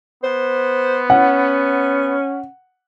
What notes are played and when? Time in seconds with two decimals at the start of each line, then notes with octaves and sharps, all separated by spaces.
0.24 B3 C5
1.10 C#4 F#5